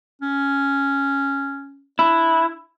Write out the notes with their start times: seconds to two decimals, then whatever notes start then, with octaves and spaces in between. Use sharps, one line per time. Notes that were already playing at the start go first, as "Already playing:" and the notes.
0.22 C#4
1.99 D4 E4